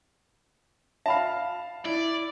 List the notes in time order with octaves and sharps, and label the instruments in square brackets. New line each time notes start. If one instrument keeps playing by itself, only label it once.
[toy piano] E5 B5 [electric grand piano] F5 A5
[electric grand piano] E4 [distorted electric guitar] D5